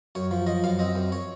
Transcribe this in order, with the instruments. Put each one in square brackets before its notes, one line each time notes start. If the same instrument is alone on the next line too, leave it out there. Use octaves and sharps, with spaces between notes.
[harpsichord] F#2 C#5
F3
F3 D#5
F#2 F5
C4 D#5
F#2
C#5